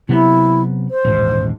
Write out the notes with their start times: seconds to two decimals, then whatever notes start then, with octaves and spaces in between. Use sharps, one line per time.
0.09 C3 F#3 B3 E4
0.90 C5
1.05 D#1 A1 G#2